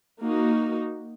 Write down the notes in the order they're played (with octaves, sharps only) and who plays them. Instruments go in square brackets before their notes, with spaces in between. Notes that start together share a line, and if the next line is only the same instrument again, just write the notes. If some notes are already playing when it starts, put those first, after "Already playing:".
[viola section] A#3 D#4 F#4